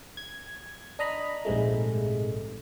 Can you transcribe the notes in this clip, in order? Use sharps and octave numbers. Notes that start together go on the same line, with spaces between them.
G#6
D4 D#5 A#5 B5
A#1 G#2 C3 G#3 A3